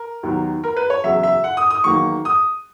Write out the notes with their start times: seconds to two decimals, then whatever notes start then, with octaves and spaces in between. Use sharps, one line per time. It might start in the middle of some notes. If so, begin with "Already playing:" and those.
Already playing: A#4
0.23 D#2 D#3 F#3 B3
0.64 A#4
0.77 B4
0.90 C#5
1.04 E2 C#3 F#3 E5
1.23 E5
1.44 F#5
1.57 D#6
1.71 D#6
1.84 E2 D#3 F#3 A#3 C#6
2.25 D#6